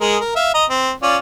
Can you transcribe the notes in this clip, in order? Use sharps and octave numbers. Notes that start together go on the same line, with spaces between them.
G#3 G#4 A#4
A#4
E5 F5
D#5 A#5
C4
C#4 F4 D5